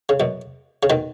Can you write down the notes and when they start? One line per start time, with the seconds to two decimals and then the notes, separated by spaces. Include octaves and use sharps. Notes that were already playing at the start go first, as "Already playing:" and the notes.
0.09 C#3
0.20 F#2 B2
0.83 C#3
0.90 B2 D#3